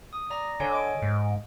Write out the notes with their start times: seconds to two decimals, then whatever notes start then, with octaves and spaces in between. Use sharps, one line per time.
0.13 D#6
0.30 D5 A#5 A#6
0.60 D3 A4 C#5 G#5
0.72 D#5 D7
1.02 G#2